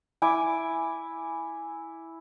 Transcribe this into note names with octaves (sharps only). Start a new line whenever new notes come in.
E4 G#5 D6